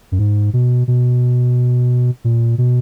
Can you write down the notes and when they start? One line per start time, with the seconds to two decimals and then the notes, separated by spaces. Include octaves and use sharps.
0.12 F#2
0.19 G#2
0.53 B2
0.88 B2
2.24 A#2
2.58 B2